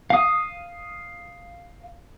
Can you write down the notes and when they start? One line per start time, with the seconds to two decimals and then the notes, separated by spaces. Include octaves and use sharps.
0.10 F5 D#6